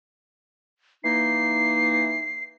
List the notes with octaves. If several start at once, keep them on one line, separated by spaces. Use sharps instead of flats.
E3 A#3 D#4 C7